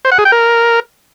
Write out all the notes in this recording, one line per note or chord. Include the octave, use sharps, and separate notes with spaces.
C5
F#5
G#4
G5
A#4